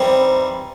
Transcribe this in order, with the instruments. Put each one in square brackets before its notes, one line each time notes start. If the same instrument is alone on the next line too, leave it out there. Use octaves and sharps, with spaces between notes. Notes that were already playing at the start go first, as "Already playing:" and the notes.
Already playing: [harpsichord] E3 G3 C4 D#4 [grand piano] C5